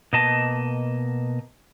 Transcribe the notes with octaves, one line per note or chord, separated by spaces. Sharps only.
B2 A#3 D#5 A5